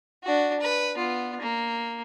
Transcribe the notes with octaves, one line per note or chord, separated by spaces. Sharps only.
D4 F#4
B4
B3 F4
A#3